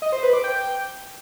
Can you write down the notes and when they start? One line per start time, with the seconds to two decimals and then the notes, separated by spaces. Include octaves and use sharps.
0.02 D#5
0.12 C5
0.23 B4
0.33 D6
0.44 G5